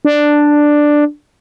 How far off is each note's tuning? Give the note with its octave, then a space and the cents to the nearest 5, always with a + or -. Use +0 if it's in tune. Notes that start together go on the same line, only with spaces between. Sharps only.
D4 +5